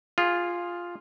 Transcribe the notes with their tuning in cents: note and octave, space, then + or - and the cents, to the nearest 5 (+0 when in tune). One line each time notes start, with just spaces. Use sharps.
F4 +0 G#4 -15